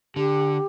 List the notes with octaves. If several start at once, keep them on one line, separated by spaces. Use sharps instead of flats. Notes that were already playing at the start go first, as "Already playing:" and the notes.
D3 G4